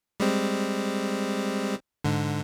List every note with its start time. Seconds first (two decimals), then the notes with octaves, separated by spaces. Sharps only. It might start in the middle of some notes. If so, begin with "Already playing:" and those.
0.20 G3 G#3 C4
2.04 G#2 D3